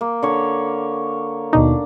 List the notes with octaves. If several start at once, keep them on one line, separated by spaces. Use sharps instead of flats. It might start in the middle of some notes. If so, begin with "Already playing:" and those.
A#3
D3 C#5
D#2 B2 D4 D#4